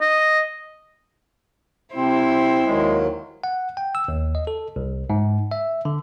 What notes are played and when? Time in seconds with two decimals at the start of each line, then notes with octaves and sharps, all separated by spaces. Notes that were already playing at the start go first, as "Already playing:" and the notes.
0.01 D#5
1.95 C3 C4 E4 C5
2.66 D#2 D#3 F#3 G#3
3.44 F#5
3.77 G5
3.95 E6
4.08 D#2
4.35 D#5
4.47 A4
4.76 C2
5.10 G#2
5.51 E5
5.85 D3